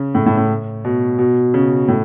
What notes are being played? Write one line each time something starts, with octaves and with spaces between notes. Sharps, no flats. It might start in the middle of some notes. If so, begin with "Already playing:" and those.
Already playing: C#3
A2
A2
A2
B2
B2
C#3
A2